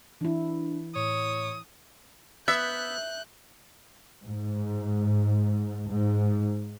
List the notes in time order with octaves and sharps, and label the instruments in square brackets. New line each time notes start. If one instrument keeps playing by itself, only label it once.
[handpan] E3 E4 [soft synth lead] D4
[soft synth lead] A2 [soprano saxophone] C#5 [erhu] D#6
[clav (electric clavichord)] B3 [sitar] E5 [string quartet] F#6 G6
[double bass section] G#2
G#2